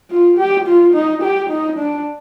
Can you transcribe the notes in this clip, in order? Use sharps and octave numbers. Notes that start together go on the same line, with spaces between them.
F4
G4
F4
D#4
G4
D#4
D4